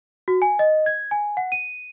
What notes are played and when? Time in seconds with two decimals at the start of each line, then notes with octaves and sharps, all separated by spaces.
0.28 F#4
0.42 G#5
0.59 D#5
0.86 G#6
1.11 G#5
1.37 F#5
1.52 D#7